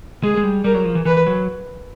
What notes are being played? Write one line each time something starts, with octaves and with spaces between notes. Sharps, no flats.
G#3 G#4
G#3
G3
G3 A#4
F#3
F3
E3
E3 B4
F#3